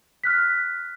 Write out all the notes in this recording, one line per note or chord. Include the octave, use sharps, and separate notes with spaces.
F6 F#6 B6